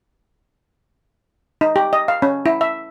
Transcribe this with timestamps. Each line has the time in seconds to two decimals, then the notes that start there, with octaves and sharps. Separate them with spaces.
1.61 D#4
1.76 G4
1.93 D#5
2.08 F5
2.22 C#4
2.46 E4
2.61 E5